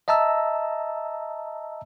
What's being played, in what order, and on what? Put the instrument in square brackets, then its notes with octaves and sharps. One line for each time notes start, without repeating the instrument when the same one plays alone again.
[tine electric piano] D#5 E5 A5 A#5 E6